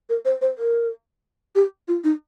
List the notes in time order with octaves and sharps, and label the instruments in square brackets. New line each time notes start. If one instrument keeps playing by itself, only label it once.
[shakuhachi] A#4
C5
C5
A#4
G4
F4
D#4